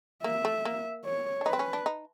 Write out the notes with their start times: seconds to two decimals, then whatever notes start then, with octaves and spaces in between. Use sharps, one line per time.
0.24 A#3 E5
0.45 A3
0.65 A#3
1.05 C#5
1.41 D4
1.46 D#4 B4
1.53 C4
1.59 C#4
1.73 D4
1.86 D#4